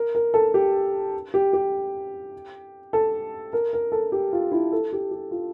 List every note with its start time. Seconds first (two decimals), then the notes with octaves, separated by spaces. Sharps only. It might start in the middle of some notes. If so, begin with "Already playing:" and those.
Already playing: A#4
0.15 A#4
0.34 A4
0.54 G4
1.34 G4
1.53 G4
2.93 A4
3.53 A#4
3.73 A#4
3.92 A4
4.12 G4
4.33 F4
4.52 E4
4.72 A4
4.93 G4
5.11 G4
5.31 F4